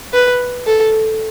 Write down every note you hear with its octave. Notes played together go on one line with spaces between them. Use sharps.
B4
A4